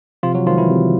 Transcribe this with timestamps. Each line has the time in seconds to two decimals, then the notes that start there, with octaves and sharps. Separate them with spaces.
0.23 C3 F3 F4
0.35 F#3 F#4
0.46 D#3 F3 G#3 F4
0.58 E3 E4
0.69 C3